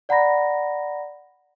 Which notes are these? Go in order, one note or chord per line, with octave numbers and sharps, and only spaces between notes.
D5 F#5 A#5 B5 A#6